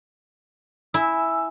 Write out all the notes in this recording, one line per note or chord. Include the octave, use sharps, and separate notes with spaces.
E4 G#5 E6